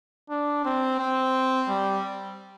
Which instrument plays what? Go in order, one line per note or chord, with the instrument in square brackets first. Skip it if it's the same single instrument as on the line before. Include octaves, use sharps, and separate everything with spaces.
[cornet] D4
C4
C4
G3